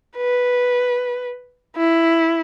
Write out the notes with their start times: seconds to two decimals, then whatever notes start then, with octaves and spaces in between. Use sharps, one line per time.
0.17 B4
1.76 E4